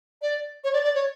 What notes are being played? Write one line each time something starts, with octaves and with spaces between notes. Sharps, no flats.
D5
C#5
D5
D5
C#5